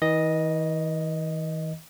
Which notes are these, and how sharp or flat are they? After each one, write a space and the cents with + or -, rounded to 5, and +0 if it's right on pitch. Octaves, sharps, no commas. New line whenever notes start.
E3 -45 D#5 +0